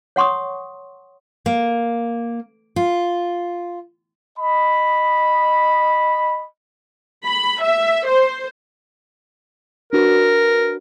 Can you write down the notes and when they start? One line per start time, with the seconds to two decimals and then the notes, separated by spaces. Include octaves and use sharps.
0.16 C#5 F#5 C6 C#6 D#6
1.46 A#3
2.76 F4
4.39 D#5 B5
7.25 B5
7.62 E5
8.07 C5
9.93 D4 F#4 A#4 B4